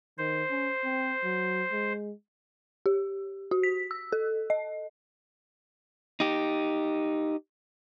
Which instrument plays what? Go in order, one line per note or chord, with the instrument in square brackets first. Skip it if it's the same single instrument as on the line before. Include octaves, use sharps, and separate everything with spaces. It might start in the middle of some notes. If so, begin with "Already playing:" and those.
[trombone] D#3 [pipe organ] C5
[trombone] C#4
C4
F#3
G#3
[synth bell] G4
F#4
B6
E6
A4
D#5
[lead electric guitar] D#4 G4